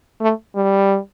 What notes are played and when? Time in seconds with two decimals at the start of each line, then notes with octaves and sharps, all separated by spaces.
0.21 A3
0.56 G3